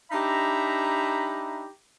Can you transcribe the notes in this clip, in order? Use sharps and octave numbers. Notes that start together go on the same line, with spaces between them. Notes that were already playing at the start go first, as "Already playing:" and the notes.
D4 D#4 G4 E5 A#5 B5